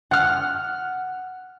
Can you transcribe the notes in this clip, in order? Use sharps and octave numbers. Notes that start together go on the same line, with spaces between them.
F#5 F6